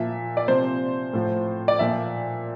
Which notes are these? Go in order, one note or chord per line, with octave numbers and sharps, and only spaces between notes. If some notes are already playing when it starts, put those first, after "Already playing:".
Already playing: A#2 F3 E5
D5
C3 F3 C5
A2 F3
D5
A#2 F3 E5